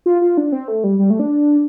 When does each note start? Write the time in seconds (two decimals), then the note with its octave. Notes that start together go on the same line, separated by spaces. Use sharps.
0.06 F4
0.21 F4
0.37 D4
0.52 C4
0.68 A3
0.84 G3
0.99 G3
1.10 A3
1.20 D4